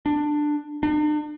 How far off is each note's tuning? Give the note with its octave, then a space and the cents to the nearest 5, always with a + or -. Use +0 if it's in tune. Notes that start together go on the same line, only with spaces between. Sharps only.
D4 +15
D4 +45